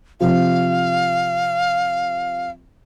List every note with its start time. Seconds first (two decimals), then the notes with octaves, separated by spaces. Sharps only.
0.20 C3 F3 F5